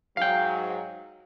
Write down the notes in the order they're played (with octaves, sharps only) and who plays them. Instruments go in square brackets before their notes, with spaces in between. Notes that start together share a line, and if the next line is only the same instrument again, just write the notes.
[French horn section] G#2 F#3 [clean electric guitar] F5 G5